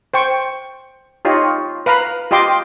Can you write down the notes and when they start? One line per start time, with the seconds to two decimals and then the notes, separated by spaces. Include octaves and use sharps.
0.14 C5 G5 C#6
1.25 D#4 F4 G4 C#5 D#5
1.86 B4 F5 A#5 B5
2.31 F4 G4 D#5 G5 C6 D6